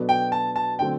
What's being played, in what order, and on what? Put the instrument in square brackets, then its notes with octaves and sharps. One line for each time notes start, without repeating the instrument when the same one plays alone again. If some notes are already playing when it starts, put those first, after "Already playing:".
Already playing: [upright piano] B2 F#3 B3 D4 A4
[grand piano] G5
A5
A5
[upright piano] D3 F#3 A3 C4 [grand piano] G5